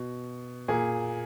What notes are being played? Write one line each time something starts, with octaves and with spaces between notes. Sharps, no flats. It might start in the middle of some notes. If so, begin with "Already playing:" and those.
Already playing: B2
A#2 G#4